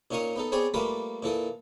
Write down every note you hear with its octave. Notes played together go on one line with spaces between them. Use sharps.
A#2 C#4 D#4 D#5 C#6 D#6
B3 D#4 A4
B3 C4 G#4 C#5 D5 G#5
G3 A3 A#3 F4 B4 D#6
A#2 E3 A4 D#6